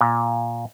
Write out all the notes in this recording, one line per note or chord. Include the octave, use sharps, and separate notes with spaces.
A#2